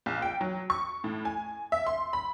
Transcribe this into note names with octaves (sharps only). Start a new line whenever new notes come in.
A#1
G5
F#3
C#6
A2
G#5
E5
C6
B5